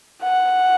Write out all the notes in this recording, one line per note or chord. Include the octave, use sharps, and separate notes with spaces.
F#5